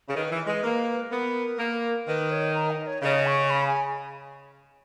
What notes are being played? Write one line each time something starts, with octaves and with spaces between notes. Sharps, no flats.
C#3
D#3 B4
E3
G#3
A#3
B3 A#4
A#3
D#3 B4
C#5
A#5
D#5
C#5
C#3 D#5
C#6
B5
G#5